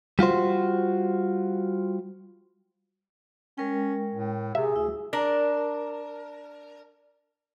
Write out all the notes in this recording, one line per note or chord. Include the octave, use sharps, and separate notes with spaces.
G3 F4 F#4 C5
G#3 C#4 A#4 G5
A2
C3 G#4 E5
D2 E4
D4 A#4